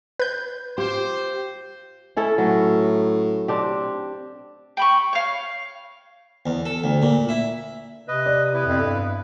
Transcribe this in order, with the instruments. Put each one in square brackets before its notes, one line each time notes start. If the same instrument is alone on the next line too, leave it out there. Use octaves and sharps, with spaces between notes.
[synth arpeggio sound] B4 G6
[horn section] F4 C5 [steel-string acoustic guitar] G4
[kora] C#4 E4 A4
[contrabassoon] A2 [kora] F#3
[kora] C4 D4 G4
[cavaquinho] G5 B5 C#6
C#5 F5
[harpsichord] E2
A4
D2
A#2
E4
[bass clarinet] C3 [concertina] B4 D#5
[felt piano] D5
[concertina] B3 E4 B4
[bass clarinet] F2
G2